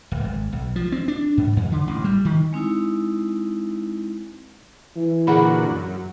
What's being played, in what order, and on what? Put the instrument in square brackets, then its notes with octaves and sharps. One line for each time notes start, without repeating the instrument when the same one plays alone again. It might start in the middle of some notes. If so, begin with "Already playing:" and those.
[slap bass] D1
G#1
B1
F3
C4
D4
G#2
F2
D3
A1
G3
D#3
[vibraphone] G#3 C4 D#4 E4
[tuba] E3
[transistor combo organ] A#2 D3 F#4 [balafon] G#4 F#5 B5
[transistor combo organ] F#2